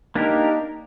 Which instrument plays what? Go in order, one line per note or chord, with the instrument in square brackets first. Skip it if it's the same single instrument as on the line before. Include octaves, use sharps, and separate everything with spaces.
[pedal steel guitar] A#3 D4 G4 A#4 [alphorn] D#4